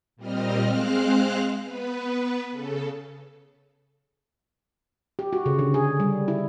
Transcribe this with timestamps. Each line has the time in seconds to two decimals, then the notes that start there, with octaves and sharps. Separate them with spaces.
0.16 A#2 G3 C4 D#5 F6
0.65 G#3 C4 C5 F5 F6 F#6
1.63 B3 B4
2.52 C#3 A4
5.19 G4
5.33 F#4
5.46 C#3
5.59 D3
5.74 G#4
6.00 G3
6.28 E4